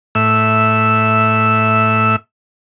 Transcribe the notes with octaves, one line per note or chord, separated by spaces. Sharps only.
A2 E5 E6